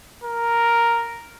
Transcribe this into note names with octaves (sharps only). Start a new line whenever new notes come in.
A#4